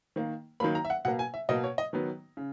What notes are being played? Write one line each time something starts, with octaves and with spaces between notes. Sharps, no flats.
D#3 A#3
D#3 F#3 A#3 B5
A#5
E5
F#5
B2 A#3 F#5
G#5
E5
B2 A#3 D#5
C#5
D#5
D#3 F#3 B3
C#3